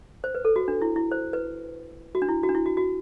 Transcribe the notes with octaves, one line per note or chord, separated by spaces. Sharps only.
C5
B4
A4
F#4
D4
E4
E4
C5
B4
F#4
D4
E4
F#4
D4
E4
F#4
F#4